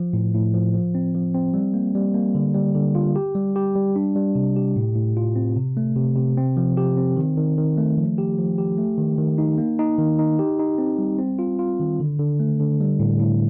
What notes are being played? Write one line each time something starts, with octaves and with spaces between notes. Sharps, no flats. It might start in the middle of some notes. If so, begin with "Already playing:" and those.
Already playing: F3
A2
A2
F3
F3
C4
F3
C4
G3
A#3
G3
A#3
D3
G3
D3
F4
G4
G3
G4
G3
D4
G3
C3
G4
A2
A2
F4
C4
C3
A3
C3
C3
C4
F3
G4
C4
D#3
D#3
D#3
A3
F3
G4
F3
G4
A3
D#3
D#3
D#4
A#3
D#4
D#3
D#4
G4
D#4
C4
G3
C4
F4
F4
D#3
D3
D3
A3
D3
G3
A2
A2